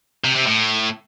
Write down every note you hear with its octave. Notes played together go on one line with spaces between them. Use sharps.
C3
C3
A2